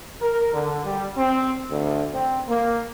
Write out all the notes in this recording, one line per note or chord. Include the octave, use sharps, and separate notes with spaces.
A#4
D3
G3
C4
D2
C4
A#3